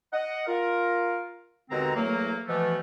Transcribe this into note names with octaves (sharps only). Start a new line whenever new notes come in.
D#5 F#5
F4 A#4
D#2 B2 D3 G#3 C4 A#5
E2 A2 F#3 A3 A#3
B2 E3 F3 A3